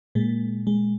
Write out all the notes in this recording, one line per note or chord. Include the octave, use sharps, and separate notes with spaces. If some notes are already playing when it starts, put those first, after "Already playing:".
A#2 G#3
G#3